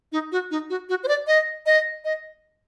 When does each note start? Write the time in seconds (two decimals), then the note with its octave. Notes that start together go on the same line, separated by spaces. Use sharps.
0.12 D#4
0.32 F#4
0.51 D#4
0.70 F#4
0.89 F#4
1.04 C5
1.08 D5
1.27 D#5
1.66 D#5
2.05 D#5